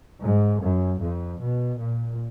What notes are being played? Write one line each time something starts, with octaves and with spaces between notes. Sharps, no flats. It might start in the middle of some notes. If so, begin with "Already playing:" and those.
G#2
F#2
F2
B2
A#2